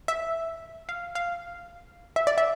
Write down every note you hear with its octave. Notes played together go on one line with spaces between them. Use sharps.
E5
F5
F5
E5
D5
E5